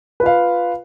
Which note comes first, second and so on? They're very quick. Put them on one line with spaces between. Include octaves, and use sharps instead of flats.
B4 F4 F5